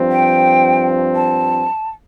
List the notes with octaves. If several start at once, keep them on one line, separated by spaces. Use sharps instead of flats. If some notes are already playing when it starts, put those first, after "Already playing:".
Already playing: G2 F3 C4
G5
A5